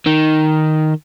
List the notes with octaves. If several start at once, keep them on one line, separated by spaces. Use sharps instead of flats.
D#3